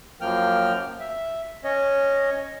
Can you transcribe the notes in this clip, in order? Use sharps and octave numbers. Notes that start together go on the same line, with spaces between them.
F#2 F3 A#3 G5 F6
E5
C#4 C#5 D#5